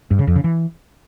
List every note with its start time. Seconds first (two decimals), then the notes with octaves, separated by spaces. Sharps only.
0.11 G2
0.19 C#3
0.27 F2
0.36 C#3
0.44 E3